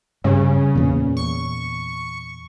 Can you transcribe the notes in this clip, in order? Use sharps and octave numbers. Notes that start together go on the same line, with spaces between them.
G2 C#3
E2 A#2
C#6